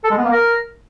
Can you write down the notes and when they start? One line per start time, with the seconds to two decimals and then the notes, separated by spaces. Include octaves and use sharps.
0.04 A4
0.11 G#3
0.18 B3
0.25 A#3
0.31 A#4